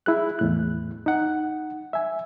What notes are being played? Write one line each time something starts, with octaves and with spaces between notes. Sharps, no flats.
E4 G#4 F#6
E2 A2 F#6
D#4 F#5
E5 G#5